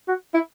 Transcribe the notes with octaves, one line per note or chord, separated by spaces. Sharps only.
F#4
E4